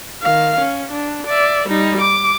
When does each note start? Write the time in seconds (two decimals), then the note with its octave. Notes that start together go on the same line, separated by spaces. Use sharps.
0.22 D#3 F5
0.59 C#4
0.91 D4
1.27 D5 E5
1.67 G3 D#4
2.01 D6